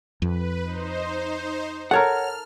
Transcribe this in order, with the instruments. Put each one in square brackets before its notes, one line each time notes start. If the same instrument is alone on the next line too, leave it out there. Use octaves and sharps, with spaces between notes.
[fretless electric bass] F2 [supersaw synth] B4
[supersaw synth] D#4 C5
[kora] A4 A#4 [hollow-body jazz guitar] C#5 F#5 [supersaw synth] F6